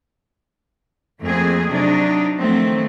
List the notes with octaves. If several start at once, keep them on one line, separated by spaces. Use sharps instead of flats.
F2 A3 A#3 C4 G#4
C3 F#3 D4 D#4
D#3 F3 F#3 A3 C4